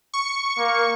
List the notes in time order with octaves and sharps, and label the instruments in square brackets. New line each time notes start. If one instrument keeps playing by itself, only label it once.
[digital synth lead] C#6
[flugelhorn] A#3